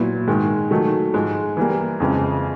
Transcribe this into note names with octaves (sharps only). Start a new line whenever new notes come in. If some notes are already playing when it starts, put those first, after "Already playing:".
Already playing: A#2 F#3 B3 E4
G#2 D#3 G#3
D#3 F#3 A3
G#2 F3 G#3
E3 G3 A#3
F2 C#3 E3 G#3